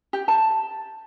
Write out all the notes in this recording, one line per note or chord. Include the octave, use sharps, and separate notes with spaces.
G4
A5